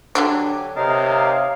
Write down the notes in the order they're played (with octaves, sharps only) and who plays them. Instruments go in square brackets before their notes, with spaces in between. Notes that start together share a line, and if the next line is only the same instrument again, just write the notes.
[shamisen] D3 F#3 D4 [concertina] G4 G#5
[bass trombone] C3 [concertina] D#4 A#4 A5 [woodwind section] C#5 D#5 F5